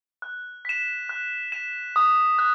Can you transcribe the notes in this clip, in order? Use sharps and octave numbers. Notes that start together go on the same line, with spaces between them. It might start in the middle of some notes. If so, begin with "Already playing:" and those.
F#6
B6 E7
F#6
B6 E7
D#6
F#6